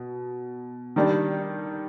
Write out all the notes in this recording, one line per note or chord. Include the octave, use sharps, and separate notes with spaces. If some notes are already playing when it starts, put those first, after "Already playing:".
Already playing: B2
D#3 G3 D4